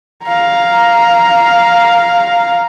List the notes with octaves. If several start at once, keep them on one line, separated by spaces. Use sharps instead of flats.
F5 A#5